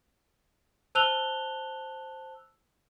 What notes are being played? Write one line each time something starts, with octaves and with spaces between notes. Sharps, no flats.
C5 A5 E6 F#6 F7 G7